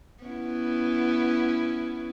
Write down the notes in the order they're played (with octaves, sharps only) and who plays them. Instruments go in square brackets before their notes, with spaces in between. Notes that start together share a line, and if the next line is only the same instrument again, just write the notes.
[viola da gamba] B3 C#4 E4